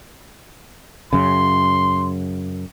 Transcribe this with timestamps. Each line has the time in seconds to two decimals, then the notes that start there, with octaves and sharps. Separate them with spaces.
1.13 F#2 C#3 C6